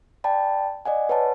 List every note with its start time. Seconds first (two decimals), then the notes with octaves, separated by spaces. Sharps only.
0.24 D5 G5 A5 B5
0.86 D5 D#5 F#5 G#5
1.09 B4 C#5 F#5 A5 B5